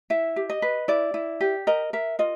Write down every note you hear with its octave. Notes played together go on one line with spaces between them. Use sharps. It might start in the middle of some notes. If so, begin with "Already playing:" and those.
E4 E5
G4
D#5
B4
E4 D5
E4
G4
A#4 D#5
A#4 E5
F4 D#5